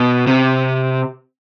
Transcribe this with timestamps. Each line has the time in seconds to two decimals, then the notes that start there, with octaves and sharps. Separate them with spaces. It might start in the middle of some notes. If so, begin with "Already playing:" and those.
Already playing: B2
0.27 C3